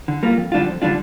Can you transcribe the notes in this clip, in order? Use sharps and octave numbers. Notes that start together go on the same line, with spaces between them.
D3
G3 A#3 F4
F2
D3 G3 D4 F4
F2
D3 G3 D4 F4